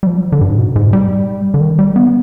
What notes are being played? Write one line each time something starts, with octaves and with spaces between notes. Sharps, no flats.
G3
F3
D3
G2
G#2
B2
G#2
G3
D3
D#3
G3
B3